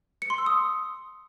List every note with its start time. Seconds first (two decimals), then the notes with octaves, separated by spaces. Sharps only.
0.22 C#7
0.30 C6
0.38 E6
0.46 D#6